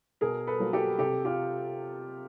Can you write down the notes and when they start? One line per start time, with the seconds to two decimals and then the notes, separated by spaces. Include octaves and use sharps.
0.21 B2 G#4 A#4
0.47 A4 B4
0.60 F#3 A#3
0.73 G4 A4
0.99 C3 G4 A4
1.25 F4 G4